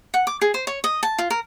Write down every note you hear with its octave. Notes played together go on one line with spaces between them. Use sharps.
F#5
D6
G#4
C5
C#5
D#5
A5
F4
A#4